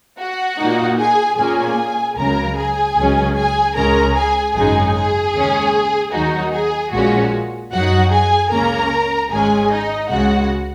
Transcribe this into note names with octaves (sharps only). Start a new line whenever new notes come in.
F#4 F#5
A#2 A#3 D#4
G#4 G#5
A#2 A#3 C#4 G#4 G#5
C#2 C#3 F#3 A#4 A#5
G#4 G#5
C#2 C#3 F#3 C#4
G#4 G#5
C#2 C#3 G#3 C#4 A#4 A#5
G#4 G#5
G#1 F#2 C#3 G#3 D#4 G#4 G#5
G#4
D#2 C#3 G#3 C#4
D#2 D#3 F#3 D#4 F#4
G#4
A#1 A#2 G#3 C#4 F#4
F#2 F#3 D#4 F#4 F#5
G#4 G#5
C#2 C#3 A#3 C#4 A#4 A#5
G#1 G#2 G#3 C#4 G#4 G#5
D#4 D#5
C#2 C#3 G#3 F#4 F#5